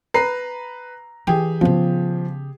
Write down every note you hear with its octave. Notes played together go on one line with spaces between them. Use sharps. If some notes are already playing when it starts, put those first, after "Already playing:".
B4 A#5 B5 C7
E3 G4 G#4
C#3 F3 B3